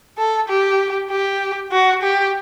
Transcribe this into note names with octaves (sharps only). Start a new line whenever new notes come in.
A4
G4
G4
F#4
G4